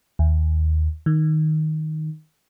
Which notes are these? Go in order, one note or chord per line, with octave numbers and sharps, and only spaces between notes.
D#2
D#3